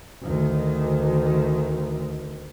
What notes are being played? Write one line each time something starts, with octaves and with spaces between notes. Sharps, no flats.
D2 D#3